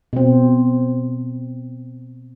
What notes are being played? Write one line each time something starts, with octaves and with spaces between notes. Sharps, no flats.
B2 C4